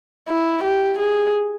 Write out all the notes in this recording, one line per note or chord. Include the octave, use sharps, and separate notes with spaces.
E4
G4
G#4